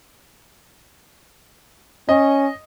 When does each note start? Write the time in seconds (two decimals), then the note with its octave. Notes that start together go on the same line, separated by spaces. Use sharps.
2.09 C#4 D#5